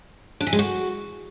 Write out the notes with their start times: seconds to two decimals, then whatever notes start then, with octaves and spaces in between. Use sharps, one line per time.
0.41 D4
0.47 E3
0.53 G#3
0.59 F#4